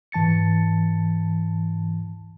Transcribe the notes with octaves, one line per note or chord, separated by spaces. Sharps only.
G#2 E3 A5 A6 C#7